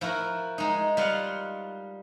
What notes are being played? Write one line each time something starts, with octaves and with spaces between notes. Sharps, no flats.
F3 E4 F#4 A#4
G#3 D#4
G3 F4 F5 F#5